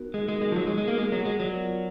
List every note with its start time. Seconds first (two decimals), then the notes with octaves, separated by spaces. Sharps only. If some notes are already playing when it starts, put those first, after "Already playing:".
Already playing: B3 D#4 F#4 A#4
0.14 G#3 D#4
0.28 G#3
0.35 A#4
0.42 G#3
0.52 F3
0.56 F#3 F#4
0.67 G#3
0.77 G#3 B3
0.88 A#3
0.98 G#3 A#4
1.12 F#3
1.19 F#5
1.25 G#3
1.39 F#3 D5
1.60 F4